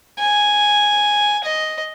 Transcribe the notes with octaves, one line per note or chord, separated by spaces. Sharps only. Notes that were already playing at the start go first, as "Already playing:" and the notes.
G#5
D#5